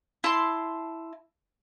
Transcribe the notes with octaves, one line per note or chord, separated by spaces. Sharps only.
E4 A5 C6